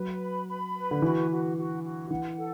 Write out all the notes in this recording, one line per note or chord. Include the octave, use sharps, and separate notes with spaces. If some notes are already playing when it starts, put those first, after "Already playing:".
Already playing: F#3 B4
B5
B5
B4
D3
E3 F#4
F#4
F#4
F#4
E3 F#5
A4